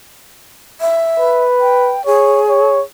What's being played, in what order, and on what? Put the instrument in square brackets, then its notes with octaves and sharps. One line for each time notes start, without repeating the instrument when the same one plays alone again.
[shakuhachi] E5
[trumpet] B4
[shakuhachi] G5
[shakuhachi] G#4 [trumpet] C#5
[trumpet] C#5